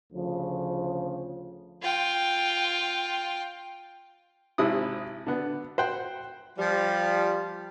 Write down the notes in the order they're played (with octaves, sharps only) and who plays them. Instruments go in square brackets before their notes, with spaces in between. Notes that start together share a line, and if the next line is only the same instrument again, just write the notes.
[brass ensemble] D2 C#3 F3
[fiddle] F4 G5
[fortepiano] G#1 C3 E4 D#6
D3 B3
C5 F#5 G5
[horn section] F3 G3